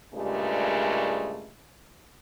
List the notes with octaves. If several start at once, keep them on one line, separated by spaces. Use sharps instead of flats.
G2 A#2 C#3 G#3 A3 G4